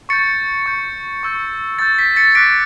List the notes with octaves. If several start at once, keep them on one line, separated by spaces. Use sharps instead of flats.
C#6 G6 A6 C#7
C#6 G6
C#6 E6 G6
C#6 E6 G6 A6
B6
A6 C#7
D6 F#6 B6 D7